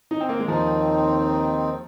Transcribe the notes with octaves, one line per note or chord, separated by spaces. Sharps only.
D#4
C4
A#3
G#3
D#2 D#3 F3 C4 D#4